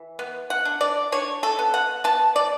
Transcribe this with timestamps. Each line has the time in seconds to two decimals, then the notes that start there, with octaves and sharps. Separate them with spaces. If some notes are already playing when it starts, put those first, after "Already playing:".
Already playing: E3
0.19 B3
0.50 F#5
0.65 D4
0.81 D5
1.12 D4 C#5
1.43 A4
1.59 B3
1.74 F#5
2.04 B3 A5
2.36 D5